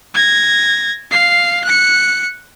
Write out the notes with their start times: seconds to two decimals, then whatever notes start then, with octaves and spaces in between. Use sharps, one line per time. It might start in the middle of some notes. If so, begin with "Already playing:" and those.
0.14 G#6 A#6
1.11 F5 C7
1.65 F#6 C#7